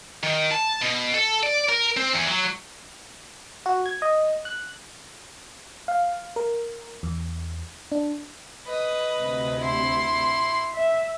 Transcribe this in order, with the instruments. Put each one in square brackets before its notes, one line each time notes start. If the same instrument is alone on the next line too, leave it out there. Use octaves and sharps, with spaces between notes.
[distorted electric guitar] D#3
A5
B2
A4
D5
A#4
C4
E2
F#3
[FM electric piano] F#4
G#6
D#5
F#6
F5
A#4
E2
D4
[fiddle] B4 D#5
[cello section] D2 C3
[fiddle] E4 C6
[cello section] E5